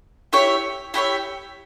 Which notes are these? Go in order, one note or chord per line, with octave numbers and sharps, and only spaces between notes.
E4 G4 C#5 E5
E4 G4 C#5 E5